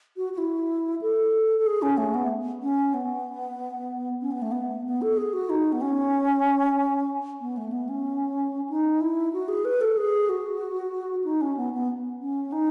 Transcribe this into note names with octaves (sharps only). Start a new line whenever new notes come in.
F#4
F#4
E4
A4
A4
G#4
C#4
A3
B3
C#4
B3
C#4
B3
A3
B3
B3
A4
G#4
F#4
D#4
B3
C#4
B3
A3
B3
C#4
D#4
E4
F#4
G#4
B4
A4
G#4
F#4
D#4
C#4
B3
B3
C#4
D#4